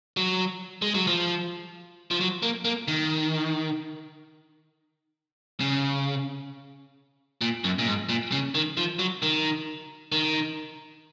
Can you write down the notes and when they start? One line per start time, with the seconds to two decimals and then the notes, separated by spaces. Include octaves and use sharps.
0.17 F#3
0.82 G#3
0.95 F#3
1.07 F3
2.11 F3
2.21 F#3
2.43 A#3
2.65 A#3
2.88 D#3
5.60 C#3
7.41 A#2
7.64 F#2
7.79 A#2
7.86 G#2
8.09 A#2
8.32 C#3
8.55 D#3
8.77 F3
8.99 F#3
9.22 D#3
10.12 D#3